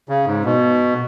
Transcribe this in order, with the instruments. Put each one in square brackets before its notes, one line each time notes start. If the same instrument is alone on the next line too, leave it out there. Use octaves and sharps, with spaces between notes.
[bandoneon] C#3
G#2
B2